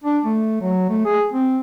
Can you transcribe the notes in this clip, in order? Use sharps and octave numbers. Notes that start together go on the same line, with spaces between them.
D4
A3
F#3
A3
G#4
C4